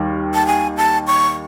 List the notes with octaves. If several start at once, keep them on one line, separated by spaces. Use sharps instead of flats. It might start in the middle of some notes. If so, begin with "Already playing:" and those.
Already playing: D#2 D#3 G3
A5
G#5
A5
C#6